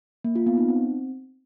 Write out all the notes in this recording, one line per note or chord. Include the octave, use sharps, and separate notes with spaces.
A#3
F4
B3
D#4
C4